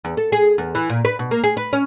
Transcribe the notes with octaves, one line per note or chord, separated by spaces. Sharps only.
E2
A4
G#4
E2
E3
A#2
B4
B2
A#3
G#4
B4
C#4